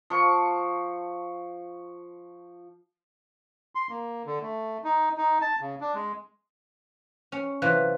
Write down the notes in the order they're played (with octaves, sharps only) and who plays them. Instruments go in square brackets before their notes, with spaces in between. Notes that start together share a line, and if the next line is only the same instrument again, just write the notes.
[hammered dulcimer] F3 C#6
[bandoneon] C6
A#3
D3
A3
D#4
D#4
A5
C#3
D4
G#3
[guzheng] C#4
C3 E3 F#3 F4 B4